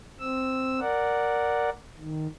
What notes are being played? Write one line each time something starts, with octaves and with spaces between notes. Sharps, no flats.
C4 E6
A#4 D5 F#5
D#3